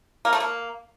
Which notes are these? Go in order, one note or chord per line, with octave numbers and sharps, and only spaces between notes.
A#3
A3
A#3